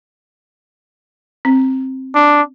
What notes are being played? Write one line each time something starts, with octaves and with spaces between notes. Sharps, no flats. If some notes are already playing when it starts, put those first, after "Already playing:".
C4
D4